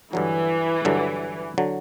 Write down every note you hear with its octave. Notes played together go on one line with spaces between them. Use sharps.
G2 D3 E3 F#3
G2 D3 F#3
D3 F#3